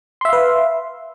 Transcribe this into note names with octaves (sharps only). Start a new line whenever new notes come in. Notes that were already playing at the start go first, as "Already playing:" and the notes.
B4 E5 F5 C6